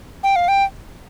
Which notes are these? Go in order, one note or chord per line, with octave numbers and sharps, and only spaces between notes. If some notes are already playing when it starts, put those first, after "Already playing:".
G5
F5
G5